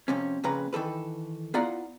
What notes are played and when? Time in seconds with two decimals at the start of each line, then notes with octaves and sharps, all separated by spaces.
0.08 F2 C3 C#4
0.44 F2 A#2 C#3 B4 A#5
0.73 D#3 E3 A4 B4
1.54 B3 E4 F4 D5 F#5 A#5